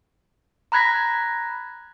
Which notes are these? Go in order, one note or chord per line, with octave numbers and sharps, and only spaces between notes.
A#5 B5 F#6 G#6 A#6 B6